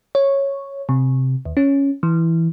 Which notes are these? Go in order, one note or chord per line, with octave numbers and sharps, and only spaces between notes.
C#5
C3
D#2
C#4
E3